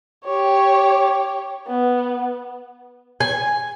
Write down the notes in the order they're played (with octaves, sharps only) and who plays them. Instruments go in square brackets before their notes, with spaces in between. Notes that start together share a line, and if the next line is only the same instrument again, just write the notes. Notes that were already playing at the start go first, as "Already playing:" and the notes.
[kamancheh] G4 C#5
B3
[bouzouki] G#5